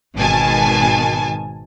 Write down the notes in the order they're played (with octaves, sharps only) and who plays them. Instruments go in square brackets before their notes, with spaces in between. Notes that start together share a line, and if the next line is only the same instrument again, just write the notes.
[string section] G#1 B2 D#3 G#5 A5